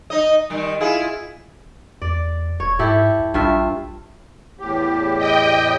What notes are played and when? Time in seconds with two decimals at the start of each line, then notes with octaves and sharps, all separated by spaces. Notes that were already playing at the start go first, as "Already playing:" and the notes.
0.10 D#4 D#5
0.50 D#3 G3
0.80 E4 F4 G#4
2.02 E2 D5
2.60 D#1 C#5
2.79 G#2 E4 G4 A4
3.19 C#2
3.34 A#1 G2 F4 E5
4.59 E2 A2 G4
5.17 D#5 G5